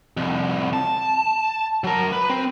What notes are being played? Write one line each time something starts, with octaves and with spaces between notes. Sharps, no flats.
C2 F2
A5
F#3 A#4
B4
C4